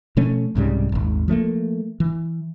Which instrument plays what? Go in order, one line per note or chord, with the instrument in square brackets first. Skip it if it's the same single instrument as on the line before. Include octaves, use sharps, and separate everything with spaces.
[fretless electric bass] B2 F3 A3 C#4
C2 G#2 C#3 G3
D#1 G#1
F3 F#3 A3 A#3
E3